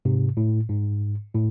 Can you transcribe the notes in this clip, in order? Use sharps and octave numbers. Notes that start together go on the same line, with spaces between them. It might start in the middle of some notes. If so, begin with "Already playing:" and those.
G#2 C3
A2
G#2
A2